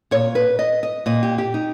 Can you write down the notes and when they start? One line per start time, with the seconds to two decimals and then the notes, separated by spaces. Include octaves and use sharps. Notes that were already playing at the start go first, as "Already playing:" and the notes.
0.11 A#2 C#5
0.35 B4
0.59 D#5
0.83 D#5
1.06 A#2 D#5
1.23 G4
1.38 G4
1.54 D#4